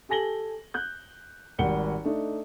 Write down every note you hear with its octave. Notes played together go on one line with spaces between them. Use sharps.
G4 A4 G#5 A#6 F#7 G7
F#6 G6
G#1 G3 G4 F#5 C#7 G7
A3 D4 D#4